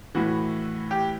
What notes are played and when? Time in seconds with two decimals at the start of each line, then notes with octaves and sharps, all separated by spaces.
0.15 A2 E3 F#4
0.91 G4